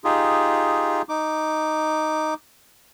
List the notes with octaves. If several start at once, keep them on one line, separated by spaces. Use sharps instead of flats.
D#4 F4 G4 G#4
D#4 D6